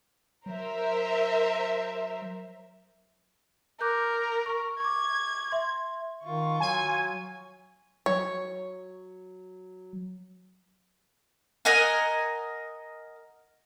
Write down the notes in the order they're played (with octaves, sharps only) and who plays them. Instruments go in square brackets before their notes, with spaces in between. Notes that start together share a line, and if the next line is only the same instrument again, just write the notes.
[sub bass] F#3 [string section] A#4 C5 E5
[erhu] A#4 [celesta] D6 F#6 G6
[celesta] C#6
[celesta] C#6 D6 [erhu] G#6
[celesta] E5 C6
[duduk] D#3 [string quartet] F4 C#6
[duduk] F#3 [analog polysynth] G#5
[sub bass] F#3 [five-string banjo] C#5
[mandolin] A#4 D#5 F#5 G#5